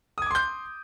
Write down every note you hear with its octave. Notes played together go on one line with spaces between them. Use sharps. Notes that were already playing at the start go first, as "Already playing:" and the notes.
C6 D6 D#6 G6 G#6